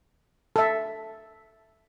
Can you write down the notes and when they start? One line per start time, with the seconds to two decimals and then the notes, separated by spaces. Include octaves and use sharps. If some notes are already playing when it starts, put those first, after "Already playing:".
0.56 A4 E5